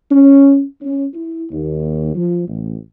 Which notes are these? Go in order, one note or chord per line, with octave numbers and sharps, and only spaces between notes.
C#4
C#4
E4
D#2
F3
A1